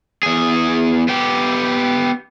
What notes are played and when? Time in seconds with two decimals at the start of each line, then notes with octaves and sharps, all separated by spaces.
0.23 E2 G#4
1.08 B3 G4